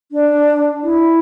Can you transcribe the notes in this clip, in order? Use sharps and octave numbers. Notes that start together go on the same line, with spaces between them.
D4
E4